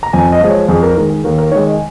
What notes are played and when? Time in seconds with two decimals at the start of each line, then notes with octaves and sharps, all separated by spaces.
0.03 A#5
0.13 F2 G#5
0.32 D#5
0.41 F3 G#3
0.49 C#5
0.69 F2 G#4
0.83 A#4
0.96 D#3 G#3 A#4
1.10 G#4
1.24 D#2 A#4
1.38 A#4
1.51 D#3 G#3 C#5
1.66 D#5
1.73 G#5